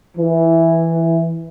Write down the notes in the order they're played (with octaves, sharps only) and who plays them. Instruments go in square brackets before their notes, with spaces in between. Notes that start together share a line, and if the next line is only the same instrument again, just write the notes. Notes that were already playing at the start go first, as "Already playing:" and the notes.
[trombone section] E3